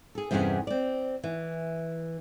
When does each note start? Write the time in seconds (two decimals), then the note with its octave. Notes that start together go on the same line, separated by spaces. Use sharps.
0.15 G#4 A4
0.31 E2 G2 C3 B3 C#4 G#4
0.67 C4 D5
1.24 E3